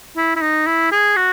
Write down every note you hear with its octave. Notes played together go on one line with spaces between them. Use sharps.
E4
E4
D#4
E4
G#4
F#4